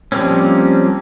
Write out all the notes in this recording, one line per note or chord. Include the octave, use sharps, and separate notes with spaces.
F3 G3 A#3 C4 C#4